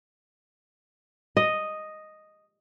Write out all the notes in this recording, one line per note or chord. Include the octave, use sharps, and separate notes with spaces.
D#5